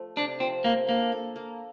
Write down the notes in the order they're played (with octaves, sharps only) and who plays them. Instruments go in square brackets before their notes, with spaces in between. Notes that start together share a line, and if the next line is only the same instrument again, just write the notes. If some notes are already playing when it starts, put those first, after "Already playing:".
Already playing: [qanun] F3 A3
[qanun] C3 [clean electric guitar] D4
[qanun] F3 [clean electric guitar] C4
[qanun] A3 [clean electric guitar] A#3
[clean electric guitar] A#3 [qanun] D4
[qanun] A4
A#3